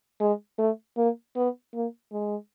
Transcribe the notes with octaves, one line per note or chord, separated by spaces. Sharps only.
G#3
A3
A#3
B3
A#3
G#3